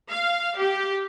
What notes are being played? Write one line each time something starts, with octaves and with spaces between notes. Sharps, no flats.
F5
G4